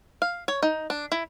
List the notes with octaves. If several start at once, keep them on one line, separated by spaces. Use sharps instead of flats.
F5
C#5
D#4
D4
E4